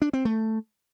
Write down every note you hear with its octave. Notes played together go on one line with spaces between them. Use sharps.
D4
C4
A3